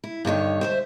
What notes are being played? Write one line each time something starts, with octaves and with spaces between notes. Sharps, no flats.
E4
G2 D3 D#3 C#5
C5 C#5 E5